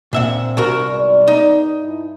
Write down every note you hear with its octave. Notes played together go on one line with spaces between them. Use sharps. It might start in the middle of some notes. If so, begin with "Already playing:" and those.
D2 A#2 C4 E5 F#5
C2 F#4 A#4
G#2 B3 D5
D#4
G2 E4